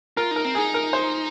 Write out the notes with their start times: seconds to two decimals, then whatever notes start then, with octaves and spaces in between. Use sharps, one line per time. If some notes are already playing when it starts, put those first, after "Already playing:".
0.17 F4 A#4
0.31 D#4
0.36 A#4
0.45 C4
0.55 D#4 G#4
0.74 A#4
0.93 C5